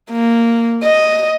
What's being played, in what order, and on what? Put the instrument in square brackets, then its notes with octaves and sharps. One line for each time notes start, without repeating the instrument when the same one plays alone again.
[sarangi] A#3
D#5